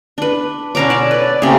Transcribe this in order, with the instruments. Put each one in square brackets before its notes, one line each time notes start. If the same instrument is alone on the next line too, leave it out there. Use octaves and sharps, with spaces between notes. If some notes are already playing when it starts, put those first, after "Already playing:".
[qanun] D4 B4
[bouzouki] B2 D3 C#5 [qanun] C#4 A#5 D6
[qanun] D5 A5
[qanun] B4 [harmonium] D5
[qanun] C#3 G#4 [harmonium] A3 A#3 C4 [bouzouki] G4